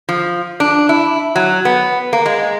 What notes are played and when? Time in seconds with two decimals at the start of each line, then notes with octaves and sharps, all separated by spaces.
0.09 F3
0.60 D4
0.89 E4
1.36 F#3
1.65 B3
2.13 A#3
2.26 G#3